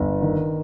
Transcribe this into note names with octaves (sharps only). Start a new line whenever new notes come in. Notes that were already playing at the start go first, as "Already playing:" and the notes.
Already playing: G1
D#3